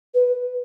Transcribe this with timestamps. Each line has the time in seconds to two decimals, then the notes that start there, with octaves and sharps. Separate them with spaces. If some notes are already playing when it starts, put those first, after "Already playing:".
0.14 B4